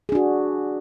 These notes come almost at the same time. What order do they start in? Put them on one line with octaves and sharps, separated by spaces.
G#4 D4 F#4